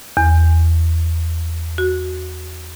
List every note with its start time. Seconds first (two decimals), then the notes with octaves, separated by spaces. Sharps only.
0.17 E2
1.78 F#4